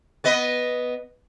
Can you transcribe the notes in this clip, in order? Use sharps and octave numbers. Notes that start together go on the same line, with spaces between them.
B3 B4 D#5